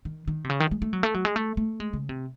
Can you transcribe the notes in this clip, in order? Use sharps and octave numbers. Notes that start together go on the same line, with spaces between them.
D#3
D#3
C3
C#3
D#3
G#3
A3
F#3
A3
F#3
G#3
A3
A3
G#3
C#3
C3